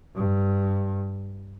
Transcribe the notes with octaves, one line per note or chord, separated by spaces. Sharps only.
G2